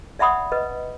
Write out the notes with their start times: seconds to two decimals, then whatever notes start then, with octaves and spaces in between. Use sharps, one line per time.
0.19 D5 E5 F#5 B5 D#6
0.52 B4 D#5